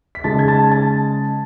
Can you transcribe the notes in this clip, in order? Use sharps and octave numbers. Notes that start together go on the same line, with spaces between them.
B6
C#3 G#3 D#4 A5 A6
G#6
A5 A6
A5 A6